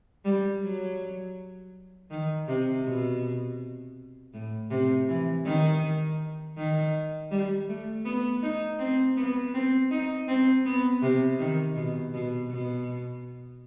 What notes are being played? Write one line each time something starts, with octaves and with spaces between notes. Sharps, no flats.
G3
F#3
D#3
C3
B2
A2
C3
E3
D#3
D#3
G3
A3
B3
D#4
C4
B3
C4
D#4
C4
B3
C3
D#3
B2
B2
B2